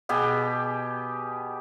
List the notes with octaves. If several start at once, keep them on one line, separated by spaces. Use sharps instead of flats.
B2 G4 G#4 G5